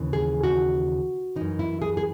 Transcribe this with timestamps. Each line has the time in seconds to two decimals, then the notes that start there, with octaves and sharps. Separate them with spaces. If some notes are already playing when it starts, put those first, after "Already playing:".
Already playing: D#2 C#3 E3
0.13 G#4
0.44 F#4
1.36 F#2 E3 D#4
1.59 E4
1.82 G#4
1.97 G#4